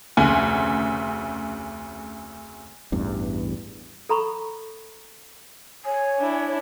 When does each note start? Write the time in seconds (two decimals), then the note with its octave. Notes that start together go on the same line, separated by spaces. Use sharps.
0.17 F1 D2 C#3 G#5
2.92 A1 E2 G2
4.09 A4 A#5 B5 C#6
5.85 C#5 G#5
6.17 D4 E4